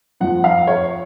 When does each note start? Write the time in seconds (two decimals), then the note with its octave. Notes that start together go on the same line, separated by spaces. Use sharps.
0.20 F2 F3 F#5
0.44 F5
0.67 C#5